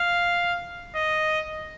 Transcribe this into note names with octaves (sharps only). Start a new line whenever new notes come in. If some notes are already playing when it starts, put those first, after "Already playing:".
Already playing: F5
D#5